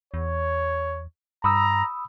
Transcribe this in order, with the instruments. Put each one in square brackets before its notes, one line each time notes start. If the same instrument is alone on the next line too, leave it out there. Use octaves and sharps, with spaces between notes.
[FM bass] E2 [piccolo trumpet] C#5
[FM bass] G2 [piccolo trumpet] A#5 [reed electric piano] B5 D#6 E6